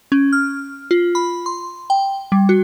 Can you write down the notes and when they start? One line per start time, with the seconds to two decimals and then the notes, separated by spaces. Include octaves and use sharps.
0.12 C#4
0.33 F6
0.91 F4
1.15 B5
1.46 C6
1.90 G5
2.32 G3
2.49 F#4